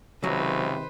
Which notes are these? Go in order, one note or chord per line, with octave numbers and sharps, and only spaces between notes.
C#2 C3 D#3 F#3 B4 C5